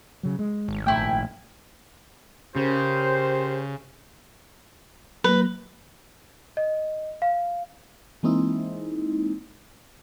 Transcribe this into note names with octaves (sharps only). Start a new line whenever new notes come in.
C#3 F#3
G#3
G#1
A#1 A3 E4 G5
C#3 C#4 G4 A#4 C5
F#3 A#3 B4
D#5
F5
E3 G#3 A#3 C4 D#4 E4